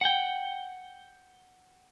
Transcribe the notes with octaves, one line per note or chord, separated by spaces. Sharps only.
F#5 G5